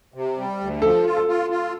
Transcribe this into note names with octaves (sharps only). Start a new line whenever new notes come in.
C3
G3
D2
F3 A4
F4
A4
F4
F4